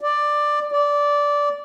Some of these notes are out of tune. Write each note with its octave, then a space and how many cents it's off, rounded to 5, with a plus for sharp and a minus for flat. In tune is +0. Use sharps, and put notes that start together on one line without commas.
D5 +10
D5 -15